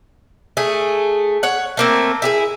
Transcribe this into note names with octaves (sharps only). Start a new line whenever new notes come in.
A3 G#4
C#5 F#5
A3 A#3 C4
E4 G4 G#4